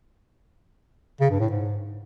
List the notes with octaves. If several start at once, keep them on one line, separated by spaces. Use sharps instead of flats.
C#3
G2
A2
G#2